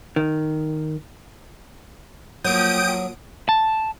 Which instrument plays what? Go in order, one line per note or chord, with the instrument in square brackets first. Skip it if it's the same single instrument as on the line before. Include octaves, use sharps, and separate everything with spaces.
[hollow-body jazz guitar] D#3
[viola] F3 A#3 [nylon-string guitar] F#3 [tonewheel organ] G5 [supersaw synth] D#6 D7
[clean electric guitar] A5